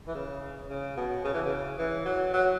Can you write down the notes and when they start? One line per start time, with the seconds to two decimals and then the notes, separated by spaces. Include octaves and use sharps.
0.07 E3
0.15 C#3
0.70 C#3
0.97 B2
1.25 C#3
1.34 E3
1.45 C#3
1.78 E3
2.06 F#3
2.33 F#3